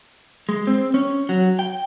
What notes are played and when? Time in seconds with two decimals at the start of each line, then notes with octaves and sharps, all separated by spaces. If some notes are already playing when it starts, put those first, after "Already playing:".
0.49 G#3
0.67 C4
0.94 C#4
1.29 F#3
1.59 G5